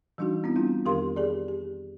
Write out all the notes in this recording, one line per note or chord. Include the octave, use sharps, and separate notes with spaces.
E3 G3 D4 D#4 F#4
B3 C4 E4
G3 D4 E4 F4
F2 D#3 G4 A#4 F5 C6
G4 G#4 D5
G4